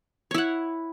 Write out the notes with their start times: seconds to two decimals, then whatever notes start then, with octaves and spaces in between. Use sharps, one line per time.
0.31 C#5
0.34 E4
0.38 F#5